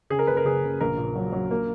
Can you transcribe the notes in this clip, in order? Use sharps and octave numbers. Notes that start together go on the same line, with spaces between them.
C#3 G#4
A#4
F#1 B4
A#4
F#1 G#4
F#1
A#1 A#4
A#2
F#3
F#3
A#3